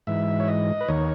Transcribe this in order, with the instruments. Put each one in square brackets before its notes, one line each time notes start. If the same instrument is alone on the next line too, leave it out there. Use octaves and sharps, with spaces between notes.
[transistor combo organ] G#2 E3 E5
C#5
D#5
B4
D#2 D#3 C#5